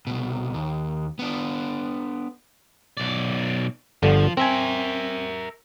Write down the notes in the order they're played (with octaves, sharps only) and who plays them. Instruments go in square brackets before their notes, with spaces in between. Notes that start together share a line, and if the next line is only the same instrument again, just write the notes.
[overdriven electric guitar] C2 B2
D#2
B3 D4
[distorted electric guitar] B1 D5
[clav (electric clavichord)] G1 G2 D3 [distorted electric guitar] F3
[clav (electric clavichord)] C4 G#5 [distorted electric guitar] A#4 E5